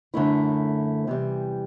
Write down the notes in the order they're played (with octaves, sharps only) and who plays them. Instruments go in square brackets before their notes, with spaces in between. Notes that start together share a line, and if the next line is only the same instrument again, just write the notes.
[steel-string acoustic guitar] F#2 D3 A3 E4
E2 C3 E3 G3